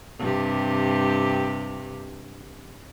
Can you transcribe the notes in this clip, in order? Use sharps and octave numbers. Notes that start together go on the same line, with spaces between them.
G2 C3 G4